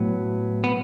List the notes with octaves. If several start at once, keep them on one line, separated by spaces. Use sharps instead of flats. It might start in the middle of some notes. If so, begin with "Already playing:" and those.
Already playing: A2 F#3 B3
B3